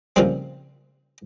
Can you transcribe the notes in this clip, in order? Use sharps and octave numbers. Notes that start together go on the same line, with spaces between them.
A#2 C#3 E3 F3 G3 C4